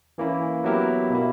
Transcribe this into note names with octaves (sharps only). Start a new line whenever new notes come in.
E3 A#3 C#4 E4
F#3 B3 E4 G4 A#4
B2 A#3 E4